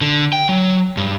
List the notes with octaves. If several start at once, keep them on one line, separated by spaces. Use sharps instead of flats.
D3
G5
F#3
G2